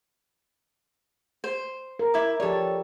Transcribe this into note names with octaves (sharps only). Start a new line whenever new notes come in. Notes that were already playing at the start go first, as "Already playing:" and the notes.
C5
A#4
E4 D6
F3 G4 A4 C#5 D5